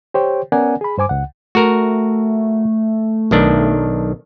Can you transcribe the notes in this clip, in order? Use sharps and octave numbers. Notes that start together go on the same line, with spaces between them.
G4 C5 C#5 G5
B3 C#4 A#4 D5 F#5 G#5
G#4 B5
G2 C5 G#5 D6
C#2 F#5
A3 F#4 A#4
B1 D#3 D4